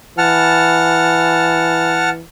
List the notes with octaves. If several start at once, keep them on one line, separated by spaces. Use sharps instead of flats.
E3 F#5 A5 F6